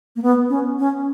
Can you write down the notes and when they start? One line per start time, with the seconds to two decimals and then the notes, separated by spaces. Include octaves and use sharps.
0.16 A#3
0.22 B3
0.49 C#4
0.79 C#4